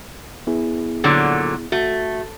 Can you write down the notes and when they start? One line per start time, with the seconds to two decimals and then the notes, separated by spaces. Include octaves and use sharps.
0.47 B3 E4 G#4
1.04 A#2 D3 F#3
1.72 A3 F#4